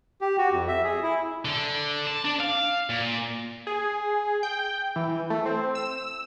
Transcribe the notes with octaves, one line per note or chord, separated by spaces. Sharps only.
G4
F#4
F2
E5
G#4
E4
D3
A5
D4
F5
A#2
G#4
G5
E3
A3
C4
E6